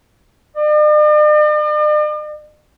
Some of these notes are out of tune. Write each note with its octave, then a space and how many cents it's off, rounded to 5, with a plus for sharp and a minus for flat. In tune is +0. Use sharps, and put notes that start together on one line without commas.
D5 +45